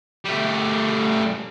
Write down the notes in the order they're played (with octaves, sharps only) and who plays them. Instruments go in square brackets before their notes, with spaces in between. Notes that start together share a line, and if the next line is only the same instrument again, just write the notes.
[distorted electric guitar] G3 A3